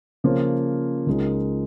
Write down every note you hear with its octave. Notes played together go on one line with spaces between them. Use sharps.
C#3 F3 A#3 F4 C5
C#2 C#3 G#3 D#4 A#4